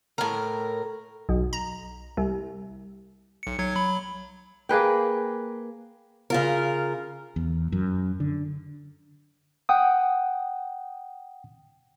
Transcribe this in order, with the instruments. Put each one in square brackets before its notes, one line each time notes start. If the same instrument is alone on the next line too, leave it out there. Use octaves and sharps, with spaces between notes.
[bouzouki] A2 A#4
[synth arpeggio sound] B1
A#5
C2
[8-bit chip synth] B1 C#7
B1 F#3 G#6
F#3 B5
[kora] A#3 G#4 B4 G5
[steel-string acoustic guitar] C#3 F4 A#4
[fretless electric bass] E2
F#2
D3
[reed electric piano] F#5 G5 D#6